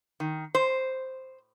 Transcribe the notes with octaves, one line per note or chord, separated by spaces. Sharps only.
D#3
C5